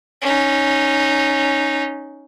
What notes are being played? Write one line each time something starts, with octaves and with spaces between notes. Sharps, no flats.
C#4 D#4